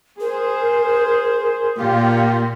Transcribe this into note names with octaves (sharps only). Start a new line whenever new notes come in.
G#4 A#4 C5
A#2 A#3 F4 G4